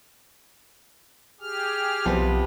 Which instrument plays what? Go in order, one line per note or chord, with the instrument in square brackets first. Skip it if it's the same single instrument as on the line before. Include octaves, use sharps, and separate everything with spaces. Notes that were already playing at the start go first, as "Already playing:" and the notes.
[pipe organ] G4 G#4 F6
[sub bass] B1 [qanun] C3 B4 [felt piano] F3 B3 C5